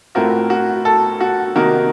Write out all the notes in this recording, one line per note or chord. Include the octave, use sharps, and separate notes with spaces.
A2 A3 C4 F4 F#4 A#4
F#4
A4
F#4
C3 D#3 A#3 D#4 F#4 A#4